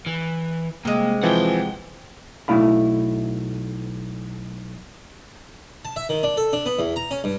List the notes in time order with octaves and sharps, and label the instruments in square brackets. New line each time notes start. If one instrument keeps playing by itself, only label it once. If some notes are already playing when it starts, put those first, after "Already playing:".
[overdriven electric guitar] E3
[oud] C3 G#3 [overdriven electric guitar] A#3
[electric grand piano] E3 F3 C4 [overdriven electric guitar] F#5 G5
[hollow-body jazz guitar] B1 G#2 A3 E4 F5 B5
[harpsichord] A5
E5
D#3
D4
A4
D4
B3
E2
A#5
C#4
G2